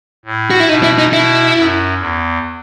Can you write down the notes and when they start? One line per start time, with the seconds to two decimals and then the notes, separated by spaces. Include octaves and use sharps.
0.25 A2
0.51 F#4
0.60 E4
0.69 B2 D#4
0.83 E4
0.99 D#4
1.12 B2 E4
1.56 F#2
1.99 E2